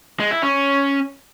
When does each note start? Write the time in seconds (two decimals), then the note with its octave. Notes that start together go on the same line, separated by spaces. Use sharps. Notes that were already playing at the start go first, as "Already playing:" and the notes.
0.20 G#3
0.31 E4
0.42 C#4